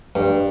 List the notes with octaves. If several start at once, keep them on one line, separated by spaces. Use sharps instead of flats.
G2